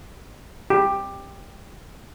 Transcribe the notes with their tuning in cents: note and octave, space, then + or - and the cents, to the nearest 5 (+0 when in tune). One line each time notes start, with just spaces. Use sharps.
G4 +10